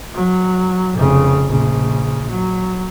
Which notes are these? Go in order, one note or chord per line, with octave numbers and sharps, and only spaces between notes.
F#3
F1 C#3
A#1 C#3
F#3